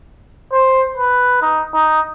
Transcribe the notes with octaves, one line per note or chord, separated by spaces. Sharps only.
C5
B4
D#4
D#4